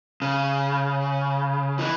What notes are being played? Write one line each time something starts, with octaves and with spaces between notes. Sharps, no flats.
C#3
E3